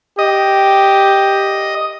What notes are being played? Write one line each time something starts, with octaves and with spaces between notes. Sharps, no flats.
G4 D#5